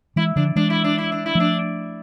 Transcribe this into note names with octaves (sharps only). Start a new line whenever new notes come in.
E3 G#3 E4
D3 F3 D4
E3 G#3 D4
E4
D4
E4
D4
E4
F3 A3 D4